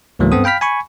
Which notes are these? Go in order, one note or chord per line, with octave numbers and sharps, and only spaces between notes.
C#2 G#2 E3 F#3 A3 A#3
G2 B3 C4 A4 C5 D#6
F5 G5 B5 F6 B6
G#5 B5 C#6